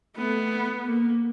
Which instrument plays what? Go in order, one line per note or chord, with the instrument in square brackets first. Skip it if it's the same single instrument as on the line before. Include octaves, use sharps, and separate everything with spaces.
[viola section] A3 [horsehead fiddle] B3
[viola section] A#3